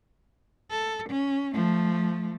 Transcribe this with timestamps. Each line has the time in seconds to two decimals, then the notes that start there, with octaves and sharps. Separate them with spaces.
0.71 A4
1.10 C#4
1.53 F3 A3